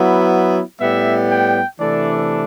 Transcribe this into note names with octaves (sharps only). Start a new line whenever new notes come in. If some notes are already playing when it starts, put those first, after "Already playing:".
Already playing: F#3 B3 E4
A2 G3 B3 E5
G5
C3 E3 A3 D4 D5